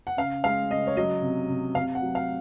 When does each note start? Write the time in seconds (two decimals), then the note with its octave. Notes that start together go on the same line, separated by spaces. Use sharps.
0.07 F#5
0.17 C#3 F5
0.44 G#3 F5
0.71 C#3 D#5
0.87 C#5
0.97 F#3 D#5
1.22 C3
1.50 C3
1.75 C3 F5
1.95 F#5
2.02 F#3
2.15 F5